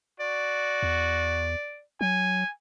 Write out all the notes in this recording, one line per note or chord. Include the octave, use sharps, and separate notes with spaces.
F#4 D5
E2
F#3 G#5